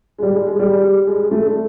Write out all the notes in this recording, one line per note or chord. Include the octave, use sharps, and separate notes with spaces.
G#3
G3
G#3
G#3
G3
G#3
A3